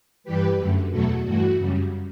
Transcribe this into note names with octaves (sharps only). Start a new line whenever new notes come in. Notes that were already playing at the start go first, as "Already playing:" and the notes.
G2 E3 G3 G4 B4
F#2 D3 A3
E2 B2 F#3 A3 F#4 A4
G2 E3 A3 F#4
F#2 C#3 G3